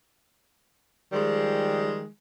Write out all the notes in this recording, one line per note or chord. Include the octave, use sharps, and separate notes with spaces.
D#3 F3 G3 G#3